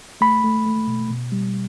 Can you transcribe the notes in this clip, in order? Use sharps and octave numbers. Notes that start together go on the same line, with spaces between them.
A3 B5
A3
A3
B2
B2
G3